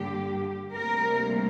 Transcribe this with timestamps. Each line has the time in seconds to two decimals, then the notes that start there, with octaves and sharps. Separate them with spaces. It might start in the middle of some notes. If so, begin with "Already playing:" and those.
Already playing: G2 D3 G3 A#3 G4
0.75 D2 C3 G3 A#3 A#4